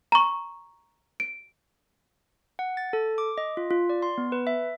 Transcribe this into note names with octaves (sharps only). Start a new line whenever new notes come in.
A#5 C#6
D7
F#5
A6
A4
D6
D#5
F4
F4
D5
C6
B3
B4
E5